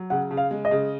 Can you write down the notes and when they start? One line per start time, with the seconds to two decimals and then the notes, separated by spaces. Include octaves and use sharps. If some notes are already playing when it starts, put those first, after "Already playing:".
Already playing: F#3
0.10 C#3 F#5
0.31 C#3
0.37 F5
0.51 G#3
0.65 D#5
0.71 C#3